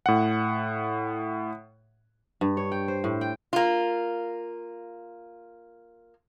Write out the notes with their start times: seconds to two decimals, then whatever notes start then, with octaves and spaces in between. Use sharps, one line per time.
0.06 A2 F#5
2.41 G2
2.57 C#5
2.72 G5
2.88 C5
3.04 A2
3.21 G5
3.53 A#3 F4